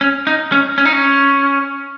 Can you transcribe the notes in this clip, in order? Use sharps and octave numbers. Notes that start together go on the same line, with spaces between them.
C#4
D#4
C#4
C#4
D#4
C#4